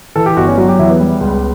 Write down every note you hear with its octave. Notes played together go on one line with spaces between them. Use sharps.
E3 A4
G4
G1 F#4
C#4
F#3 F#4
G4
E2 E4
B3
G3
C#2